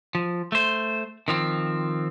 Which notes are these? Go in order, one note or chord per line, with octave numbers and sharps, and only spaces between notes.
F3
A3 C5
D#3 F3 C4